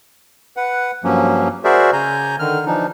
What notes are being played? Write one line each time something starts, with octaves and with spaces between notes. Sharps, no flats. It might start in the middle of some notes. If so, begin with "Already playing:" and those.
B4 F#5
G2 F3 F#3 A#3 C#4
F#4 G#4 A#4 C5 D5 E5
C#3 G#5 A#5 G6
D3 D#3 F6
E3 F3 D4 D#4